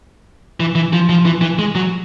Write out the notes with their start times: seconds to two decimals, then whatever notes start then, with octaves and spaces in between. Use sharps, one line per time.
0.60 E3
0.75 E3
0.93 F3
1.09 F3
1.25 E3
1.42 E3
1.59 G#3
1.75 F#3